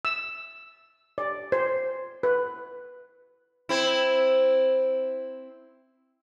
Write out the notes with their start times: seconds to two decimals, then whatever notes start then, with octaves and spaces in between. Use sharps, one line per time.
0.05 E6
1.18 D5
1.52 C5
2.23 B4
3.69 C4 E4